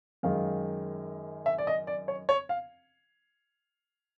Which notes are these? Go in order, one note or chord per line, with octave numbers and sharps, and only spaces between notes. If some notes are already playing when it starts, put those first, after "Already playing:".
F#2 D#3 G#3 F5
E5
D5
D#5
D5
C#5
C#5
F5